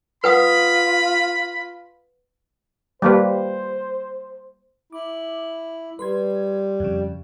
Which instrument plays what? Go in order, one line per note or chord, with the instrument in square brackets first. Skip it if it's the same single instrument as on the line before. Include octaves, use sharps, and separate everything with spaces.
[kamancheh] F4 [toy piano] B4 F#5 D#6 [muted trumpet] B5
[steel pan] G3 A#3 B4 [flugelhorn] C5
[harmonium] E4 [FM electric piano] D6
[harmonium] G3 [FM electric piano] B4 C6 G#6
[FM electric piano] F2 C#3